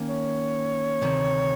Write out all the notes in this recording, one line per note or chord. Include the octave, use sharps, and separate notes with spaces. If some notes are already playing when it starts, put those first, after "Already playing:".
Already playing: D#3 A#3 C#4
C#5
D2 C3 D#3